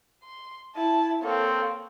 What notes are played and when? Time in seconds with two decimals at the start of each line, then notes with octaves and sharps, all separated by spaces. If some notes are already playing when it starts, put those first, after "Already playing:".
0.23 C6
0.76 E4 A5
1.23 A#3 C4 A4 C#5